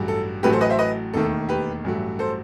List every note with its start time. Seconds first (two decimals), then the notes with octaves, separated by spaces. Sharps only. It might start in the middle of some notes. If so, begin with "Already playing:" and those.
Already playing: A1 G2 F#3 A3
0.08 A4
0.43 A1 A2 F#3 A3 G4 B4
0.53 A4 C5
0.61 B4 D#5
0.70 C5 E5
0.79 B4 D#5
1.14 E1 D#2 D#3 A3 A4
1.49 G4 B4
1.84 A1 G2 F#3 A3
2.19 A4 C5